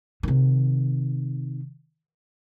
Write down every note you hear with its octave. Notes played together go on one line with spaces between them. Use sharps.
C3 D#3